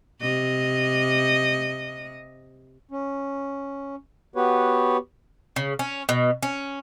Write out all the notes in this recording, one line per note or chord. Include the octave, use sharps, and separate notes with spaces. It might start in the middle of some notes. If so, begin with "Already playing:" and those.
C3 D#5
C#4
B3 F#4 G4 B4 C#5
C#3
C#4
B2
C#4